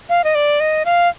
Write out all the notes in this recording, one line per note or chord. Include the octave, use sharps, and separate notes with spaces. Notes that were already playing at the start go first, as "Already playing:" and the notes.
F5
D#5
D5
D#5
F5